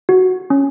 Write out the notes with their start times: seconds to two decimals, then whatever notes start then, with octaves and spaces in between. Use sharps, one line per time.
0.09 F#4
0.50 C#4